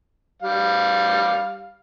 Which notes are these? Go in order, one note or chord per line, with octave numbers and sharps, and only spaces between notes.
G3 F5